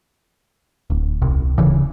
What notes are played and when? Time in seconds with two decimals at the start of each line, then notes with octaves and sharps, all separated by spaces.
0.90 D1
1.22 D#1 C2 C3
1.58 D1 C#3 E3